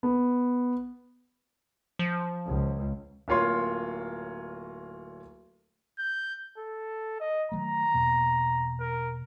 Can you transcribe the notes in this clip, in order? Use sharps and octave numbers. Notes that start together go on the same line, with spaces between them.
B3
F3
C#2
D1 A#3 F4 C#5 C6
G6
A4
D#5
D#3 F#3 A3 A#5
E2 B2 A#3
A#4